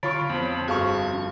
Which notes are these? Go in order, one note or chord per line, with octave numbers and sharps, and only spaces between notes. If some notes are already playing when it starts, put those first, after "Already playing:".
D3 F4 C#5 B5 C#6
F2 F3 B3
G1 F#4 G#4 F5 C#6
C#4